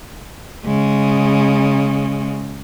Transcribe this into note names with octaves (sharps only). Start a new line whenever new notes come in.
C#3 G#3